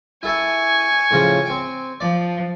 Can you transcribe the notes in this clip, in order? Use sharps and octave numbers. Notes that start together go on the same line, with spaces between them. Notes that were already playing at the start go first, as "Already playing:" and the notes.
E4 A4 E5 G#5 C#6
A2 C#3 F3
C4 G5
F3 D5